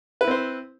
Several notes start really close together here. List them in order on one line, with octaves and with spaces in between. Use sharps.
B4 E4 C4 C5